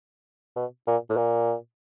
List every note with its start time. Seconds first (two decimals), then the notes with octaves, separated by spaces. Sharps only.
0.56 B2
0.87 A#2
1.09 A2
1.17 A#2